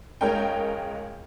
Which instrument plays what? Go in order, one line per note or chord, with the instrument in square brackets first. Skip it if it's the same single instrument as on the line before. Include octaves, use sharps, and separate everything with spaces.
[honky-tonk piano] C#2 G#3 A#4 C#5 D#5 G5